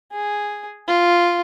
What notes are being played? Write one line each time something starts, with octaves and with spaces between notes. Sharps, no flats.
G#4
F4